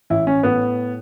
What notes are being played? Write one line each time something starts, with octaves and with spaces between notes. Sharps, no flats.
A1 E4
C#4
A2 B3